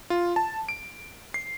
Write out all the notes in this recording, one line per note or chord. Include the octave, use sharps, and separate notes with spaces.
F4
A5
D7
C7